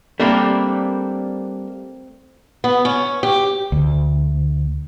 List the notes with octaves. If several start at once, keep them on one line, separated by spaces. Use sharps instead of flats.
G3 A3 A#3 C4 D4
B3
C#4
G4
D2